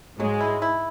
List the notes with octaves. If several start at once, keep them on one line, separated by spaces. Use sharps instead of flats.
G#2 F#3 G#3
E4
E4